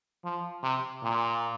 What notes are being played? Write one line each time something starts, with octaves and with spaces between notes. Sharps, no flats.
F3
C3
A#2